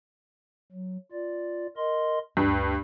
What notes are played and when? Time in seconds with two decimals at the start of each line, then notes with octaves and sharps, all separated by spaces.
0.72 F#3
1.12 F4 D5
1.76 A#4 D#5 C6
2.37 D2 G2